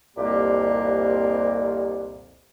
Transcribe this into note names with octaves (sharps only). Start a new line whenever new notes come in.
C2 F2 A#2 A#3 G4